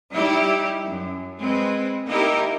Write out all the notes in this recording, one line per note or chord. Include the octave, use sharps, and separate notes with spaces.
G3 D#4 E4 G4
F#2
G#3 C4 B4
A#3 D#4 E4 G4 A#4